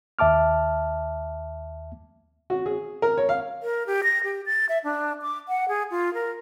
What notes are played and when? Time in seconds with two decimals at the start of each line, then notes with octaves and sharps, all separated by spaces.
0.19 D#2 E5 A5 D6 F6
2.50 F#4
2.66 G#4
3.02 A#4
3.18 C#5
3.29 F5
3.63 A#4
3.86 G4
4.03 A#6
4.24 G4
4.46 A6
4.69 E5
4.84 D4
5.22 D6
5.48 F#5
5.68 G#4
5.90 F4
6.14 A#4